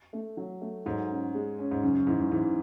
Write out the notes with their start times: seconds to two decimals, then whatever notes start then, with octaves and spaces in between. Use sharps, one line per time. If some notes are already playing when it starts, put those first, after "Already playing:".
0.13 A3
0.37 F#3
0.61 A3
0.86 G#2 F#3
1.10 C#4
1.34 G#3
1.59 C#4
1.71 G#2
1.83 F#2 C#3
1.95 F#2
2.07 G#2 E3
2.19 F#2
2.32 G#2 E3